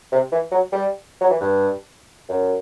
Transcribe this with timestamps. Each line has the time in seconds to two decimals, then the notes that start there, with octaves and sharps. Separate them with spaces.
0.12 C3
0.32 E3
0.52 F#3
0.72 G3
1.21 F#3
1.30 E3
1.41 G2
2.29 F#2